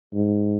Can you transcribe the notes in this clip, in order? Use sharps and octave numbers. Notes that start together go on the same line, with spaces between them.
G#2